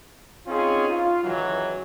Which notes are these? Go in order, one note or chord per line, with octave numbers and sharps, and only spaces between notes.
C4 C#4 D#4 F4 G#4
F4
C#2 D#3 E3 F#3